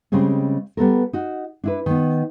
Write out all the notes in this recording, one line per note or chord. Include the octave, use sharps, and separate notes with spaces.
C#3 G3 G#3 C4 C#4
G3 B3 A4 A#4
D#4 F#4
D4 E4 B4
D#3 B3